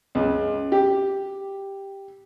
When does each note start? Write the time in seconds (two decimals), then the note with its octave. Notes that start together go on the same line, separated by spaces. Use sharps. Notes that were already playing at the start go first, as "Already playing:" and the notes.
0.15 C#2
0.72 G4